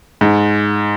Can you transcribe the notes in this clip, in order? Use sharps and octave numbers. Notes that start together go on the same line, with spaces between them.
G#2